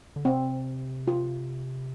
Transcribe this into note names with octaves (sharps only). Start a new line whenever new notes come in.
D3
C3 C4
F4